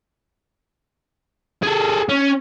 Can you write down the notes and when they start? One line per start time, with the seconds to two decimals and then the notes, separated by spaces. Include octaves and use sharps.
1.63 G#4 A4
2.09 C#4